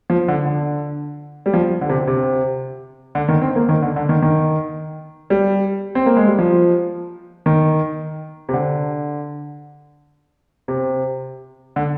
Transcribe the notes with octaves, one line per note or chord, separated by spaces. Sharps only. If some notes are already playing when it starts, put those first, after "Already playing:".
F3
D3
D3
G3
F3
D3
C3
C3
D3
D#3
C4
A#3
D#3
D3
D3
D#3
D#3
G3
C4
A#3
G#3
G3
F3
D#3
C3
D3
C3
D3